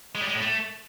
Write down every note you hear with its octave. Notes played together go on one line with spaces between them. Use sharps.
G#3
G3
G#3
A2
A3